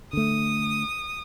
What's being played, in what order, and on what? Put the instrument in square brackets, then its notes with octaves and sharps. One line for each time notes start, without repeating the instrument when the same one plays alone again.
[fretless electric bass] D3 A3 [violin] D#6